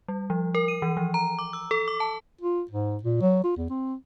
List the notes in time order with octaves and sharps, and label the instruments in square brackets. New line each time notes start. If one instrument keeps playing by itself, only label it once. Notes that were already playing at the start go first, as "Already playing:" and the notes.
[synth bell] G3
F3
A#4
D#7
E3
F3
A#5
D6
E6
A4
D6
A5
[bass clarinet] F4
G#2
A#2
F#3
F4
E2
C4